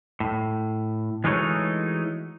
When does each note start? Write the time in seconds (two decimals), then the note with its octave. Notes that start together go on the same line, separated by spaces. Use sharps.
0.20 A2
1.24 E3 G#3 A3 D#4 F#4 C#5